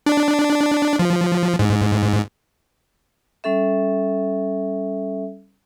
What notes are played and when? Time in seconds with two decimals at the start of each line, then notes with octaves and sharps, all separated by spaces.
0.06 D4
0.99 F3
1.59 G#2
3.44 G3 C#4 A4 E5